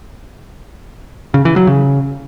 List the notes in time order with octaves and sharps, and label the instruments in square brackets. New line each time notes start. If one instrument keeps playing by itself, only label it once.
[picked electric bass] C#3
E3
F#3
C#3